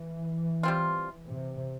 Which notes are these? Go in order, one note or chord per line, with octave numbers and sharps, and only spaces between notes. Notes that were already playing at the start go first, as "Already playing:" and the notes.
Already playing: E3
G3 C4 F4
C3